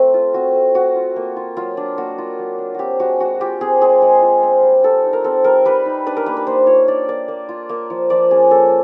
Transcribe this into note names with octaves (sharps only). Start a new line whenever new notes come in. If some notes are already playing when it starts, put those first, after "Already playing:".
Already playing: A3 C4
F4
C4 F#4
A3
A3 F#4
F4
A#3
F4
F#3 F4
D4
A#3 F#4
F4
F#3
D4
C4 F#4 G4
G#3 F#4
G#3 F#4
F4 G4
C4 G#4
G#3 G#4
G#3
F4
C4
G3
G3 A4
D#4
A#4
C4 A4
G3 A#4
G3 B4
D#4
D4 B4
A#4
A#3 B4
B4
A#3 C5
F4 C#5
D4 D5
A#3 D5
A#3
F4
A#3
F3
F3 D5
C#4 G#4
A#3 A4